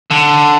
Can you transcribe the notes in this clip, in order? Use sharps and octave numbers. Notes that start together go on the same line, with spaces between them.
D3